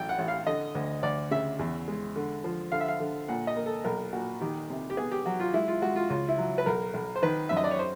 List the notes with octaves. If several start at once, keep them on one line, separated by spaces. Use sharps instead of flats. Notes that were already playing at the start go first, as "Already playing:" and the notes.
Already playing: A1 F#3 G5
F#5
A1
F5
D3 D#5
D2
D2 D5
C#3 E5
E2
G#3
D3
F3
D3 F5
E5
F5
D3
A#2 F#5
D#5
A#3
A4
B1 A#4
A#2 F#4
D#3 G4
C3
G4
B3 G#4
G4
F#3 F#4
F4
G#3 E4
F4
G#3 F#4
F4
C#2 F4
E4
F#3
B4
B1 A#4
B1
C5
D#3 B4
F#2 E5
D#5
D5
C#5
C5